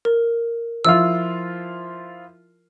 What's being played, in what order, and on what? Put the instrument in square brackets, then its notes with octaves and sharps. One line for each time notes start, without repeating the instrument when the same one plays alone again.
[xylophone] A#4
[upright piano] F3 E4 F4 [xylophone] E6